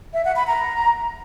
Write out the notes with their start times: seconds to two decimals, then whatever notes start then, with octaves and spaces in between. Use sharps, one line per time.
0.14 E5
0.25 F#5
0.36 B5
0.47 A#5